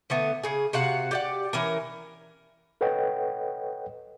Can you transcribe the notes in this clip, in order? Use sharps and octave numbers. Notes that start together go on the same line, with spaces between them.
D3 A3 B3
C#3 G#4
C3 F#4 F5 F#5
G4 D5 F#5
E3 C#4 A#4
A4 B4 C#5 D#5 F#5 G5